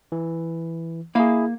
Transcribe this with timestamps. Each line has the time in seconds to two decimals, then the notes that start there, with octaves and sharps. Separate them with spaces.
0.12 E3
1.15 A#3 E4 G#4 F5